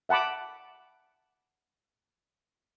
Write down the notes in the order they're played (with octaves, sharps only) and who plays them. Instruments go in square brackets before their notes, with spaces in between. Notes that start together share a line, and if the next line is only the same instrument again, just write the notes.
[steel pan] E5 F#5 A5 B5 D6